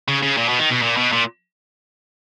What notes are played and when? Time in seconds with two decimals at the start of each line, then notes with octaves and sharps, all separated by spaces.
0.08 C#3
0.23 C#3
0.37 A#2
0.49 B2
0.59 D#3
0.71 B2
0.82 A#2
0.97 B2
1.12 A#2